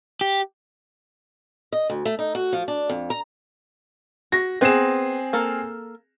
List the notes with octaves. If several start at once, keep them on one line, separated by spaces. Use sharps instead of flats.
G4
D#5
D2
A3
D#4
F#4
F3
D4
F2
A#5
F#4 A#6
B3 C4 G#4 B4 E7
A#3 A4 A#4